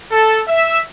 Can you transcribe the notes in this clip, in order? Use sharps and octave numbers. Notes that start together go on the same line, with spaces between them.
A4
E5